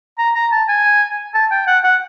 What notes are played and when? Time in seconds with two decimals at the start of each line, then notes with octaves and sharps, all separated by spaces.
0.18 A#5
0.35 A#5
0.52 A5
0.68 G#5
1.34 A5
1.51 G5
1.67 F#5
1.84 F#5